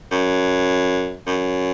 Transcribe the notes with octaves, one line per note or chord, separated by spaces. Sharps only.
F#2
F#2